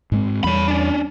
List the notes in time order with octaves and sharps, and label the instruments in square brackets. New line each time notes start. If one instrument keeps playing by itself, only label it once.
[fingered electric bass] G#2 G#3 C4
[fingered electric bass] E2 G3 [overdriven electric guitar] C#5 B5
[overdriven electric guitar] C#4 D4